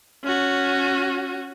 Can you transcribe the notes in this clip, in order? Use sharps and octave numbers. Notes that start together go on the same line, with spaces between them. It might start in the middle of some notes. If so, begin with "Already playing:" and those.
C#4 F#4